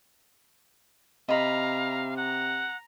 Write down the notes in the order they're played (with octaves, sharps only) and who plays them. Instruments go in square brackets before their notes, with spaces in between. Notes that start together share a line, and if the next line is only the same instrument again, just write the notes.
[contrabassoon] C3 [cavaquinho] D#5 B5 [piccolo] F5 [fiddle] A#5
[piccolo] F#5 [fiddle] A#5